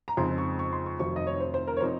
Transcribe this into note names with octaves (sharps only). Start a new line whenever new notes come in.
A#5
F2 C#3 G#3 C4 D#4 C6
C#6
C#6
C6
C#6
F1 F2 D#3 F#3 C4 C#6
D#5
C#5
C5
C5
A#4
C#5
F3 C4 D#4 C5